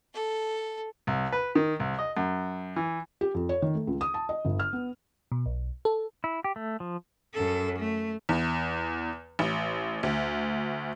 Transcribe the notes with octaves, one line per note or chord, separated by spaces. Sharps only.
A4
C2
B4
D#3
C2
D#5
F#2
E3
G4
F2
C#5
D#3
A3
C#2
D#6
A5
D#5
G1
F6
B3
B2
B1
A4
E4
G4
A3
F3
F#2 A4
A3
E2
A1
D2